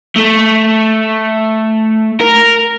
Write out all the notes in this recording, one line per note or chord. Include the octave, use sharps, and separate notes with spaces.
A3
A#4